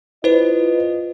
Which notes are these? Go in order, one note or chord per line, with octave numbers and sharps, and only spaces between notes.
E4 F4 B4 C5 D#5